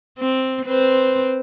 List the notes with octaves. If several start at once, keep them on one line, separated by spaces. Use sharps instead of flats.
C4
C4 B4 C5